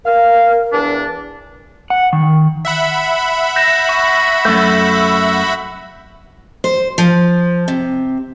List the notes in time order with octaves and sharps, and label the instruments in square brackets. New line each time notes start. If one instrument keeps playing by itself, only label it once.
[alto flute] A#4 [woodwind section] F5
[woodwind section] E2 D4
[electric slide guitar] F#5
D#3
[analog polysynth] E5 F#5 B5
[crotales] G6 A#6 E7
C#6
[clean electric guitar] F#2 A3 [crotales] G6
[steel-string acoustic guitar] C5
F3
C3